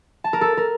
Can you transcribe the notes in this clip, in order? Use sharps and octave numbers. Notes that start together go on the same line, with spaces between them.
A5
A#4
A4
A#4